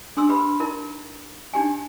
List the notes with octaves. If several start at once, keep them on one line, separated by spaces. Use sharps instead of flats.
D4 G#4 C6 E6
G4 B4 B5
D#4 E4 A#4
D4 D#4 G4 G#5